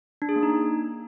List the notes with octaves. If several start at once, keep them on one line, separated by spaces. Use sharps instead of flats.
D4
G#4
A#3
D#4